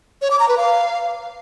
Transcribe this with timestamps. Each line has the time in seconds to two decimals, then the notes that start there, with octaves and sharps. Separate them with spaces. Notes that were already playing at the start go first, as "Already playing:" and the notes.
0.22 C#5
0.31 D6
0.40 A#5
0.48 B4
0.57 F5